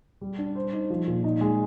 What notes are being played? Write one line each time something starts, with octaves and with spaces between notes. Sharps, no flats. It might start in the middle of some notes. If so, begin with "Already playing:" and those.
G3
D4
C5
D#4
F3
A#2
D#4
G#3